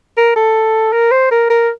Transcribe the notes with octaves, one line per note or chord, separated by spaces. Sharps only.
A#4
A4
A#4
C5
A#4
A#4